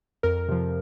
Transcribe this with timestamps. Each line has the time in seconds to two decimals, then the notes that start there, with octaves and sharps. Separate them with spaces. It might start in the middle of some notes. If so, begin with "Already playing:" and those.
0.23 F2 A#4
0.48 C3 F3